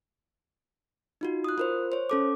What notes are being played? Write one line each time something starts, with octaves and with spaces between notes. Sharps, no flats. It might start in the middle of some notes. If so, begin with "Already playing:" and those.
D#4 F4 F#4
D#6 F#6
F4 A#4 C5
C5 C#5
C#4 A4 D6